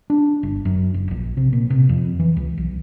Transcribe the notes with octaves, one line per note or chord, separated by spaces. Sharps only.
D4
G1
F#2
F#1
A#1
C3
A#2
C3
F2
E3
C#2
B1